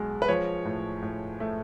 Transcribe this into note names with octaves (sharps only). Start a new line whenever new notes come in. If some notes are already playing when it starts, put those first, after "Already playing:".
Already playing: B1 B2 G#3
B4
F3 C#5
A2
A2
A3